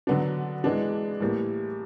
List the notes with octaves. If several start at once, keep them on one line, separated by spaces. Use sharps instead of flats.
D3 F#3 B3 D4
E3 G#3 B3 D4
A2 E3 G3 A#3